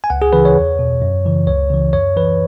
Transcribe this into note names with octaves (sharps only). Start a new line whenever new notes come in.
G#5
C#2 F#5
G#4
C#3 E3 B4
C#5
E2
B2
F#2
C#3 E3
C#2 C#5
C#3 E3
F#2 C#5
E3 B4